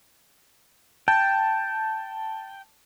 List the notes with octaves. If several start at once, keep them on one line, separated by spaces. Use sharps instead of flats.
G5 A5